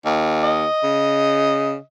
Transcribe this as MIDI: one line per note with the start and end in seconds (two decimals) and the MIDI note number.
0.06 0.65 39
0.44 1.81 75
0.83 1.76 49